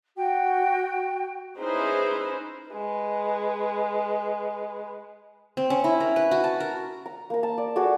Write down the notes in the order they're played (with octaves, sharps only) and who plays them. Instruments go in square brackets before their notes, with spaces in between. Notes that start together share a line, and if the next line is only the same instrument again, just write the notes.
[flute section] F#4 G5
[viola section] C#4 D#4 E4 G#4 B4 C5
[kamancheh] G#3 B4
[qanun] C4
C#4
E4
A#4
B4
F#4
A5
A#4
[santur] A#5
A#3 A#5
A5
D5
F#4 G#4 A4 D5